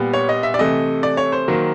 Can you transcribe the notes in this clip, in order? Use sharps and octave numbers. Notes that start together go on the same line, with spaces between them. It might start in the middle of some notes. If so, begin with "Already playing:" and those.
Already playing: A#2 G3 B3
C#5
D#5
E5
D5
C3 E3 A3 D#5
D5
C#5
C5
D#3 F#3 A#3